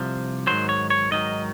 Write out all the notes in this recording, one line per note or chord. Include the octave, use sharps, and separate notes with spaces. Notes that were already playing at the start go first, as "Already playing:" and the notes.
Already playing: C2 C3 F3
G#2 D#3 F#3 C5
C#5
C#5
G#2 D#3 F#3 D#5